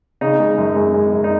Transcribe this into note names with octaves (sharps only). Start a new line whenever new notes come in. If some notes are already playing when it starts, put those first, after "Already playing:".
C#3 D#4
G#3
F#2
G#3
G#3
F#2
D#4